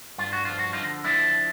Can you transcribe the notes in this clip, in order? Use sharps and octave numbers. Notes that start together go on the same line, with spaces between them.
G2 F4
F#4
F3 F4
F#4
D3 D#4 F4
F3 D4 E4